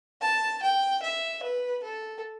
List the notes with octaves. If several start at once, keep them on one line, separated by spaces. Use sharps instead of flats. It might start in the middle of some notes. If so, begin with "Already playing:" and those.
A5
G5
E5
B4
A4